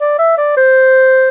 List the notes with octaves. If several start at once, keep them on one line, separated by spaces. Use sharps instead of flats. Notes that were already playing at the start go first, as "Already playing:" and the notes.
D5
E5
D5
C5